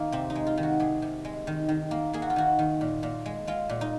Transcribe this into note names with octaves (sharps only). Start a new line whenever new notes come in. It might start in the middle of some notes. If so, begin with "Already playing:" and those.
Already playing: D#3 A#3 D#4
C3 C4
D#4
G#3
F4
D#3
F#4
C3 G#4
C3
G#3
D#3
D#3
A#3
A#3 G#4
F#4
F4
D#3 F#4
D#3
A#2
A#2
G#3
G#3 F4
A#2
D#4